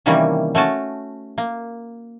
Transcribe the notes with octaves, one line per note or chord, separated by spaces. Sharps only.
C3 D#3 E3 G3 A#3 C#4
A3 C#4 F#4 A5
A#3